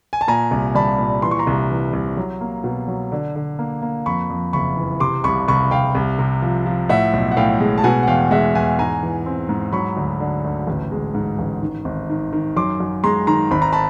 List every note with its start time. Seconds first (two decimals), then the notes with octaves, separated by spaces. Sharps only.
0.13 G#5
0.21 A5
0.28 A#2 G#5 A#5
0.51 C2
0.75 G3 A5 B5
0.98 A#2
1.22 E3 C6
1.31 C#6
1.39 A#5 C6
1.47 C2
1.70 E3
1.93 C2
2.17 F#3
2.41 A#3
2.64 B2
2.88 F#3
3.12 D3
3.35 D3
3.59 A#3
3.82 A#3
4.06 F2 B5 C#6
4.30 F2
4.53 F#1 B5 C#6
4.77 E3
5.00 C3 C6 D6
5.24 C2 B5 C#6
5.48 C2 B5 C#6
5.71 C2 F5 G5
5.95 C2
6.19 C3
6.42 F3
6.66 F3
6.89 A2 E5 F#5
7.13 B1
7.32 F#5
7.37 A2 F5 G5
7.60 G#3
7.78 A5
7.84 B2 F#5 G#5
8.03 F#5
8.07 E2 F5 G5
8.31 G#3 E5 F#5
8.55 E2 F#5 G#5
8.79 G#2 G#5 A#5
9.03 E3
9.26 C4
9.49 G#2
9.72 F#3 B5 C#6
9.97 D2
10.20 D3
10.44 D2
10.67 A1
10.91 G#3
11.15 G#2
11.39 A1
11.62 D#3
11.85 G#1
12.10 D#3
12.33 D#3
12.56 F#2 C6 D6
12.80 F#2
13.04 G#3 A#5 C6
13.27 D#3 A#5 C6
13.51 G#1 B5
13.62 A#5
13.73 A5 B5